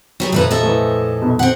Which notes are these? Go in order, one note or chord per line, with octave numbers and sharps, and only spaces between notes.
F#3 G3 G#4
F2 A#2 A3 D#4 B4
A4 D#5 E5
E3 A3
B1 B2
C4 F#5